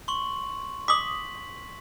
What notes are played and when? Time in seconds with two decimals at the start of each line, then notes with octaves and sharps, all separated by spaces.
0.08 C6 C#6 F#7
0.88 D6 D#6 B6 F#7